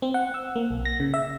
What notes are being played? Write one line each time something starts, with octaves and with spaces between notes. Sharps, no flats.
C4
F#5
E6
A#3
B1
A#6
C#3
E5